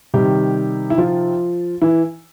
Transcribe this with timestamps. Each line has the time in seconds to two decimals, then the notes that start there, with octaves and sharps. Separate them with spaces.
0.14 C3 D#3 G3 G4
0.90 E4
0.98 F3 F4
1.82 E3 E4